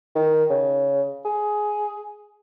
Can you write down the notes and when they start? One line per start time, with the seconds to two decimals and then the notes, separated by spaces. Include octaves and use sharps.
0.15 D#3
0.50 C#3
1.25 G#4